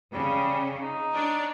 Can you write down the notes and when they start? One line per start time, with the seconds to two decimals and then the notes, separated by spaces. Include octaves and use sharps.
0.13 C#3 G3
0.81 D#4
1.13 D4 C#5 D5